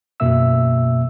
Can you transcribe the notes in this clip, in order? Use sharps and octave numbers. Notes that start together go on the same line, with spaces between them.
F#2 B2 A#3 E5 E6